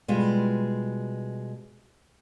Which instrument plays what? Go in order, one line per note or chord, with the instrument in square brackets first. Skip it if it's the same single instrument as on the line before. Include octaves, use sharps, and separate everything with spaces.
[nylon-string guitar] B2 G3 G#3 F4